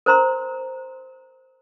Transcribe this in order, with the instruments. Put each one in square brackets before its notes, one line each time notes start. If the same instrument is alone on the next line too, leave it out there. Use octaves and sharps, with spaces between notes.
[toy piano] A#4 C5 A#5 C6